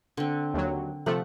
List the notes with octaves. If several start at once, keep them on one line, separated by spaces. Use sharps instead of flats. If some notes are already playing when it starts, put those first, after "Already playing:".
D3 C4
D#2 F#3
C3 F3 A3 F#5